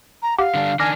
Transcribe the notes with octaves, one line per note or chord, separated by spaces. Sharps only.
A#5
G4 F5 F#5
D3 G3 D4
D#3 D4 G#5 D6 F6 A#6